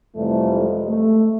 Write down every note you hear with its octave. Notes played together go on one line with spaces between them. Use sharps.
F2 C3 E3 G3 A3
G#3
A3